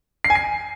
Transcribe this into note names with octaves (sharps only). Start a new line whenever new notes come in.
C7
G#5
C7